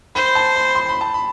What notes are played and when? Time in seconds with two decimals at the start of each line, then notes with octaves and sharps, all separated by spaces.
0.15 C5 B5
0.35 A5
0.56 B5
0.75 C6
0.89 B5
1.01 A5
1.14 B5